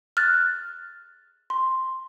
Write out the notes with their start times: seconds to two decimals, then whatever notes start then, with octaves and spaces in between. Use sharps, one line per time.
0.17 F6 F#6 A6
1.50 C6